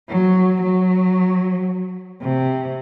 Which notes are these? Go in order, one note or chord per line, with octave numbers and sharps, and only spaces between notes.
F#3
F#3
C3